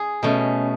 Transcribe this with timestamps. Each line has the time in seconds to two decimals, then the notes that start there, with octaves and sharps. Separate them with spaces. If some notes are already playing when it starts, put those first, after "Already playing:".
Already playing: G#4
0.23 B2 A3 C#4